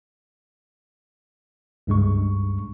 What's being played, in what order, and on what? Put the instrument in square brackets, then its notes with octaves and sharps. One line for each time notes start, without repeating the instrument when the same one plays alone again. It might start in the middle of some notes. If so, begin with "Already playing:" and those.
[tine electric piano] C#2 G2 G#3 C#6